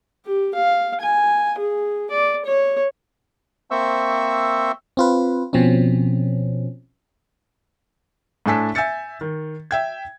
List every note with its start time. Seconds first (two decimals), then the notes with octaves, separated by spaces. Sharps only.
0.26 G4
0.55 F5
1.01 G#5
1.59 G#4
2.10 D5
2.45 C#5
3.71 A#3 C4 C5 E5 C#6 E6
4.97 C4 F4 B4
5.53 B2 F3 C4 C#4
8.46 A2 D4 A4 G#5 A5 B6
8.75 E5 G#5 E6 G6 A6 C#7
9.21 D#3
9.71 E5 G5 G#6